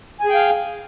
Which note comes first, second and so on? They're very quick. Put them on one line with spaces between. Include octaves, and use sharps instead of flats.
G#5 G#4 G5 F5